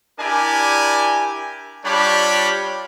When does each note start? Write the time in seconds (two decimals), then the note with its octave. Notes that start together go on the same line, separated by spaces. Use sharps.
0.20 D4 E4 G4 A#4 D5 G#5
1.85 G3 D4 F4 G4 C#5 B5